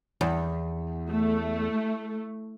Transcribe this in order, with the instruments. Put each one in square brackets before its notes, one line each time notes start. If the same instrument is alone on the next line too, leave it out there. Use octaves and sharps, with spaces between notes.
[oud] E2
[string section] A3